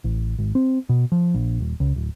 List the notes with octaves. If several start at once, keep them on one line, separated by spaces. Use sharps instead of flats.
A1
G#1
C4
B2
F3
A#1
D#1
C#2
D1